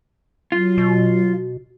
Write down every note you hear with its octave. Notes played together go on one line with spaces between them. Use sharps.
F#3 F4
B2